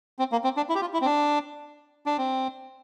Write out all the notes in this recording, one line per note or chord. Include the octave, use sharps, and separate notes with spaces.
C4
A#3
C4
D4
E4
G4
F4
E4
C4
D4
D4
C4